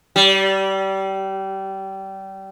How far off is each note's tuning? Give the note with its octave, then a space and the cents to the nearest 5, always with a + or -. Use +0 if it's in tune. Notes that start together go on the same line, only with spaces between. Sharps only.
G3 -25